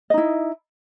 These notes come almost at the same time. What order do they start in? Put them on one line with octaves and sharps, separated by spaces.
D#5 D#4 E4